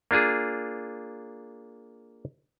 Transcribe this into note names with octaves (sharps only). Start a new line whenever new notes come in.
A#3 D4 F4 G#4